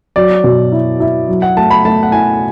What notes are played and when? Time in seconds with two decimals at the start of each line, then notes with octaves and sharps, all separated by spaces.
0.16 F#3 D5
0.44 B2
0.72 E4
1.00 E4
1.28 F#3
1.42 F#5
1.56 A3 A5
1.71 B5
1.85 A3 A5
2.03 F#5
2.12 E4 G#5